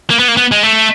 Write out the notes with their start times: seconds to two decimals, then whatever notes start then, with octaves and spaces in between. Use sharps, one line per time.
0.10 A#3
0.19 B3
0.28 A#3
0.37 B3
0.52 G#3
0.63 A3